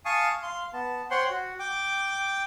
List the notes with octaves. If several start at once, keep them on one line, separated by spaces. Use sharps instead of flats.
F5 G#5 A5 C#6 D#6
F5 C6
B3 A5
C5 C#5 F#5 G5 C6
F#4
G5 D6